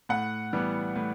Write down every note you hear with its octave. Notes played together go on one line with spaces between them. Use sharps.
A2 F#5
E3 G3 B3
A2